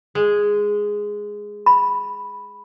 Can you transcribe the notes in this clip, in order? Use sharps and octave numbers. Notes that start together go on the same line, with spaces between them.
G#3
B5